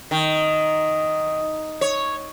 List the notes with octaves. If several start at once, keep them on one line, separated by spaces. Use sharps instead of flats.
D#3
C#5